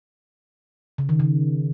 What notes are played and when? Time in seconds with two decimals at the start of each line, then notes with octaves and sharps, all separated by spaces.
0.98 C#3
1.09 D#3
1.20 C#3